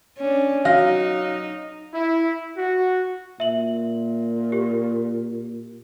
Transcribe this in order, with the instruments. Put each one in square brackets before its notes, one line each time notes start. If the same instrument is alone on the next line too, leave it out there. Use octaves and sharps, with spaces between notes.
[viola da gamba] C#4 D4
[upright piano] F#3 F5 A#6 [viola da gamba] D#4
[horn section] E4
F#4
[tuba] A#2 [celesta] E5 F#7
[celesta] G4